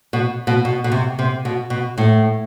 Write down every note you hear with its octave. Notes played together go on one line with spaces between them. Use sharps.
B2
B2
B2
B2
C3
C3
B2
B2
A2